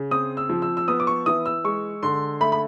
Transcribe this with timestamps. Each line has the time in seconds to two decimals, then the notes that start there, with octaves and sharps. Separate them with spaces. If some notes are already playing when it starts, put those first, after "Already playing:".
Already playing: C#3
0.11 C4 D#6
0.37 E6
0.49 F3
0.62 E6
0.77 E6
0.88 B3 D#6
1.00 D6
1.07 C#6
1.26 E3 D#6
1.46 E6
1.64 G#3 C#6
2.03 D3 C6
2.41 A3 B5
2.52 B5